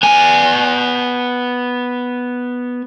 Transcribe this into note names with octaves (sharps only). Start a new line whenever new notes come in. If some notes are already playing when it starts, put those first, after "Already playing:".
B3 G#5